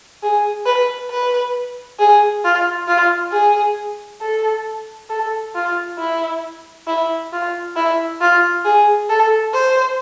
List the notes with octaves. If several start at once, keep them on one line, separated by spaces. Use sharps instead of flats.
G#4
B4
B4
G#4
F4
F4
G#4
A4
A4
F4
E4
E4
F4
E4
F4
G#4
A4
C5